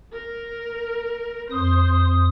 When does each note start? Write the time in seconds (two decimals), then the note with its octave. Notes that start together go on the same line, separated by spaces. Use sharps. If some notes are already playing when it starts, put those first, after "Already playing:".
0.12 A#4
1.51 F2 C5 D#6